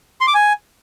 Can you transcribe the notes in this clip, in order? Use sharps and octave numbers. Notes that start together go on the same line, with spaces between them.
C6
D6
G#5